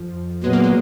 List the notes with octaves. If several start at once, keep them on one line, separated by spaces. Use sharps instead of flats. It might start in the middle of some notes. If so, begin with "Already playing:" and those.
Already playing: F2 F3
A#2 F#3 G#3 B3
A#3
G#3